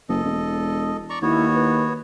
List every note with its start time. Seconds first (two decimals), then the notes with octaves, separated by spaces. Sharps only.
0.09 F#1 A4 D#5
0.24 E1
1.10 D5 A#5 C#6
1.22 D#2 B3 E4 F#4 C#5
1.54 B4